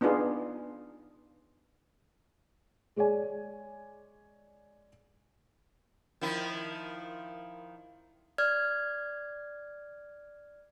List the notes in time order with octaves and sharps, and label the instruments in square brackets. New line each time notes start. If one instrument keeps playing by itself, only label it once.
[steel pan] B3 D4 D#4 F4 G#4
[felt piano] G#3 G#4 C#5 D5 G#5
[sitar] D#3 F3 E4
[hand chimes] D5 F6 G#6